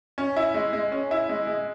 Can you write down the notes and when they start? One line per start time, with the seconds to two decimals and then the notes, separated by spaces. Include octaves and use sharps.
0.18 C#4
0.36 E4
0.54 G#3
0.73 G#3
0.92 C#4
1.11 E4
1.29 G#3
1.47 G#3